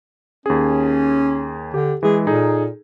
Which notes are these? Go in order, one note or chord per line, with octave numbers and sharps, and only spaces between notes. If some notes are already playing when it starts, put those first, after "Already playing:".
D#2 C#4 G#4
D3 G4
E3 G#3 G#4
A#2 D#4 G#4 A4